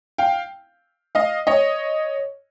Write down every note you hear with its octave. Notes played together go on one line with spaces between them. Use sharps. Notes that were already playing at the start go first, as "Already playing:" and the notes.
F5 G5
D#5 F5
C#5 D#5